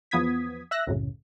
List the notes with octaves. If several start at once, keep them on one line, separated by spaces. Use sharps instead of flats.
E2 F3 B3 D#6 G#6 B6
E5 E6 F#6 A#6
C2 F#2 A2 C#3